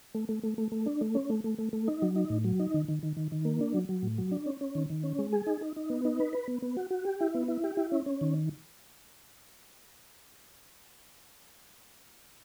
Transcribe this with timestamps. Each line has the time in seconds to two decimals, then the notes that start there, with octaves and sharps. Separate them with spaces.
0.15 A3
0.29 A3
0.43 A3
0.58 A3
0.72 A3
0.86 D4
1.01 A3
1.15 C#4
1.30 A3
1.44 A3
1.58 A3
1.73 A3
1.88 D#4
2.02 F#3
2.16 D#4
2.30 A2
2.44 F#3
2.59 D#4
2.74 D#3
2.88 D#3
3.03 D#3
3.17 D#3
3.32 D#3
3.45 A#3
3.61 D4
3.74 F#3
3.89 F#3
4.03 A2
4.18 F#3
4.32 D4
4.46 C#4
4.61 C#4
4.75 D#3
4.90 D#3
5.04 C#4
5.19 G#3
5.33 G#4
5.47 D#4
5.61 D#4
5.76 D#4
5.90 B3
6.05 D#4
6.20 B4
6.33 B4
6.48 B3
6.62 B3
6.77 F#4
6.91 F#4
7.05 G4
7.21 E4
7.34 B3
7.48 E4
7.64 G4
7.77 E4
7.92 C#4
8.06 C#4
8.21 D#3